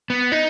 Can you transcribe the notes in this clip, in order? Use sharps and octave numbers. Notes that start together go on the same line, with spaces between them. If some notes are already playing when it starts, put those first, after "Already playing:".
B3
D#4